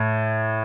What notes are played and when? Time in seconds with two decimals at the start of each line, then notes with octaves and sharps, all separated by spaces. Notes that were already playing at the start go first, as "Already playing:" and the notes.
Already playing: A2